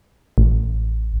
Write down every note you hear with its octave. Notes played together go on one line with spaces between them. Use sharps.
A1